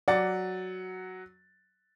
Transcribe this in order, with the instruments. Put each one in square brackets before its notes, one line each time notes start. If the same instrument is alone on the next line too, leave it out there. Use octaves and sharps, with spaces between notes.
[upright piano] F#3 F#5 A6 [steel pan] D5